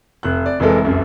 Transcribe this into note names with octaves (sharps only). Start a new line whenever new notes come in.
F1 F#6
D5
F1 E3 G#3 A4 A#4
F1 C2 F#2